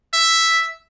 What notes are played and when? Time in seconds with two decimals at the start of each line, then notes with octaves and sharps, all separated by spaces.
0.13 E5